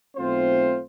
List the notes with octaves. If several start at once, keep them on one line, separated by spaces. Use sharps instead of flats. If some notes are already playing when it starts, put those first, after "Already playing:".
B1 A3 C4 F4 C5